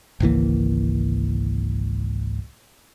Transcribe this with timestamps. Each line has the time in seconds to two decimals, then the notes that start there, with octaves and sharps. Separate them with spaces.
0.20 G#1 C#2 E3 A#3